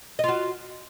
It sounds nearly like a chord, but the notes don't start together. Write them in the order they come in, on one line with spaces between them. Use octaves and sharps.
D#5 F4 F#4